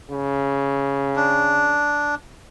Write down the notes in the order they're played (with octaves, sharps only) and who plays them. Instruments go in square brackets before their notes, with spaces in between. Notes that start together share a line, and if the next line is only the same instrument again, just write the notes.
[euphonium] C#3
[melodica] D4